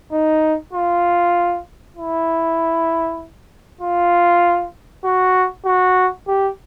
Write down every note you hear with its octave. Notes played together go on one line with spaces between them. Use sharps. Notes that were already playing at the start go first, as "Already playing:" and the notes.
D#4
F4
E4
F4
F#4
F#4
G4